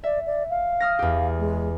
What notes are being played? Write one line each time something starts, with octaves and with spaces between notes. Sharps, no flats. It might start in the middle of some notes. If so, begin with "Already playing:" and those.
D5 E5
D5
F5
D#6 F6 A#6
E2 G4
G#3